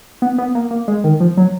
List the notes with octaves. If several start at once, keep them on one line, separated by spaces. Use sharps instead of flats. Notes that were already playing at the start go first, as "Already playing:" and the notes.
B3
B3
A#3
A#3
G#3
D#3
F3
F#3